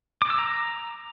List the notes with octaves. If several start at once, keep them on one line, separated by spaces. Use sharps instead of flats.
D6
E6
A#5